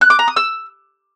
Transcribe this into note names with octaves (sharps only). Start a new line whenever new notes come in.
F#6
D6
A#5
D#6
E6